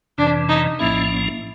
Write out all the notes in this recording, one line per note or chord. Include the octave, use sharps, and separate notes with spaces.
F2 C3 E3 D4
D#4
A#1 A2 F3 A#3 C#4 E4